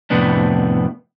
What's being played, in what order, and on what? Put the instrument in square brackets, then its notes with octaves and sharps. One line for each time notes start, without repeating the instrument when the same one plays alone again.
[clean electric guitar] F2 A2 C3 B3 D4